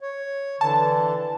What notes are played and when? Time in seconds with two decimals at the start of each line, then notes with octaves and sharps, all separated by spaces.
0.01 C#5
0.61 D3 E3 A5